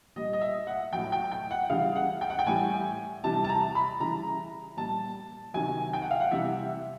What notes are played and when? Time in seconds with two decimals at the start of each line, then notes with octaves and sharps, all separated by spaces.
0.16 A#2 G3 D#5
0.33 D#5
0.41 E5
0.67 F#5
0.93 A2 F#3 G5
1.12 G5
1.32 G5
1.51 F#5
1.70 C#3 E3 G3 F5
1.96 F#5
2.21 G5
2.30 F#5
2.39 G5
2.46 A2 E3 G3 G#5
3.24 C3 E3 G3 A5
3.44 A5
3.49 A#5
3.75 B5
4.00 C#3 E3 G3 A#5
4.77 A#2 G3 A5
5.54 C3 D#3 F#3 G#5
5.93 G5
6.02 F#5
6.11 F5
6.20 F#5
6.31 C3 E3 G3 E5